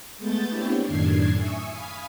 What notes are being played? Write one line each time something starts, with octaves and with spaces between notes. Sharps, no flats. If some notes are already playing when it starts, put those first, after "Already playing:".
G#3 A3 B3 G6 A6
B3 C4 D4 E4 G4 C#5
F#2 A2 D#3 D4 G#6 C7
E5 G#5 C#6 D#6
F5 G#5 B5 D#6